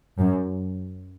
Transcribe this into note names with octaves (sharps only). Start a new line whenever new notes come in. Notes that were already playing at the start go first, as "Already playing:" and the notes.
F#2